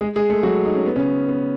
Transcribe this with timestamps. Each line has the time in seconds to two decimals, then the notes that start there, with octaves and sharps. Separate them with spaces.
0.01 G#3 G#4
0.16 G#3 G#4
0.30 A3 A4
0.43 F#3 F#4
0.65 D#4
0.75 C#4
0.86 B3
0.96 C#3 C#4
1.28 B3